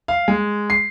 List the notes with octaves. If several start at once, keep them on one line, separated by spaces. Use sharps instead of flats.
F5
G#3
C7